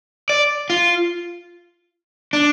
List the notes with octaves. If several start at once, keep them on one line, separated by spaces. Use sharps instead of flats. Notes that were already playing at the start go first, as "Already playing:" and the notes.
D5
F4
D4